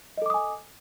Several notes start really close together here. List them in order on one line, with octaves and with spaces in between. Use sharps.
D#5 A4 D6 D#6 G#5